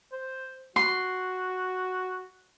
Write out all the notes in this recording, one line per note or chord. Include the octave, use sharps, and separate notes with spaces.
C5
F#4 C6